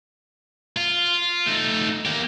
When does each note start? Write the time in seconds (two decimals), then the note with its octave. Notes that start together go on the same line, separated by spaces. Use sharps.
0.77 F4
1.46 A3 D#4
2.06 A#3 G4